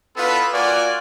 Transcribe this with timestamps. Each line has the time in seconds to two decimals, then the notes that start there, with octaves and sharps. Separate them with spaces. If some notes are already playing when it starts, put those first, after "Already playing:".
0.17 B3 D4 E4 F4 A4 B4
0.53 A#3 F4 F#4 D5 F#5 G#5